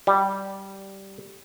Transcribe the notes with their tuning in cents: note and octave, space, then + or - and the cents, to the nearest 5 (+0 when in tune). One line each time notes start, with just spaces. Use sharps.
G3 -10